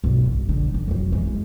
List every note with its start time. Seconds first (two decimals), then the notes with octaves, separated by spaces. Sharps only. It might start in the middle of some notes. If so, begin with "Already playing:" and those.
0.04 B1 G2
0.26 G#2
0.49 D3
0.74 D#4
0.88 F2 F#3
1.12 E3 G#3